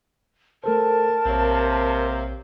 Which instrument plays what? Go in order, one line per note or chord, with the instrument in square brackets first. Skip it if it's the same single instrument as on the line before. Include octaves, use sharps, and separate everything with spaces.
[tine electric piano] A3 A4 C5 [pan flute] A#4 [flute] A5
[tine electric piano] A#1 C#5 [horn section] C3 A#3 C4